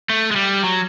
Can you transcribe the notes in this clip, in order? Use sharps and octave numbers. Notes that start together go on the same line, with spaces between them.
A3
G#3
G3
F#3